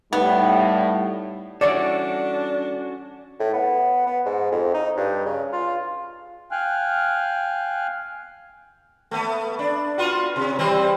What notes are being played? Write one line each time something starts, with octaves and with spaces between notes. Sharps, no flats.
A2 G3 B3 D#4
E3 G3 C#4 D4 F#4 A4 C#5 D5
A2
B3
B3
G#2
F2
D#4
G2
C#3
F4
F5 G5 G#5 F6 F#6
A3 B3
D4
B3 F4 F#4
C3
E3 G3 C4